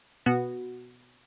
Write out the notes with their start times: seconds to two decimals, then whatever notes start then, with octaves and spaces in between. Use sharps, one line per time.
0.26 B2 B3 F#4